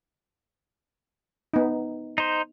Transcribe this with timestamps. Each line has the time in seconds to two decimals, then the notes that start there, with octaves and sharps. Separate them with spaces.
1.53 B3 D#4
2.18 D#4 C5